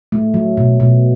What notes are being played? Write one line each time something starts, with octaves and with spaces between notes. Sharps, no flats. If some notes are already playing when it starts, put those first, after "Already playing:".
A3
F#3
B2
B2